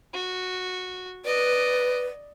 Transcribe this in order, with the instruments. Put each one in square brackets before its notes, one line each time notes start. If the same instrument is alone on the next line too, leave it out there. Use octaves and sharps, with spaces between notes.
[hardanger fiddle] F#4
[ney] B4 [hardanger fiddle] D5 D#5